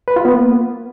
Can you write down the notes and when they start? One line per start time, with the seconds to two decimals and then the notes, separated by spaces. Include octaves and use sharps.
0.08 B4
0.16 F4
0.25 B3
0.34 A#3